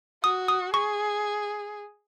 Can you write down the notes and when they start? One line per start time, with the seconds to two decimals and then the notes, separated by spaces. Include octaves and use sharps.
0.24 F#4 D#6
0.48 D#6
0.73 G#4 C#6